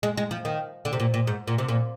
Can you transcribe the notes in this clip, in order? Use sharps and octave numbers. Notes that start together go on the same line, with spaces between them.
G#3
G#3
F3
D#3
D3
C3
A#2
A#2
G#2
A#2
C3
A#2